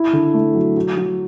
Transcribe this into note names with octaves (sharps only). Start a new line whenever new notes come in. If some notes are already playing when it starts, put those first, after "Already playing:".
Already playing: E4
D3
A3
F#3
F#3
F#3